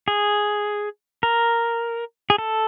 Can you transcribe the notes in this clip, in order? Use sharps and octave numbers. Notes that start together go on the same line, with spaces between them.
G#4
A#4
G#4
A4